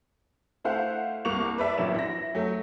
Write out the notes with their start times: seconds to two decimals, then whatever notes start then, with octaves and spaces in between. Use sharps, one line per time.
0.64 A3 E4 C5 F5 F#5
1.25 C2 A#3 C#6 F7
1.58 B4 D5 E5
1.78 A1 A#2 F#3 E7
1.94 E4 A#6
2.35 F#3 A3